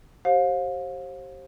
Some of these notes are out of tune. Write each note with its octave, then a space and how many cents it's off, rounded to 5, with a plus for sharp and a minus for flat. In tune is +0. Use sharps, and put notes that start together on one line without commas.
G4 -20 C5 +35 F5 +30